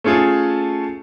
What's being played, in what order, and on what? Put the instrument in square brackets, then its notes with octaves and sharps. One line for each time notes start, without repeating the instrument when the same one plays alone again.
[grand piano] A3 C#4 F4 G#4 A4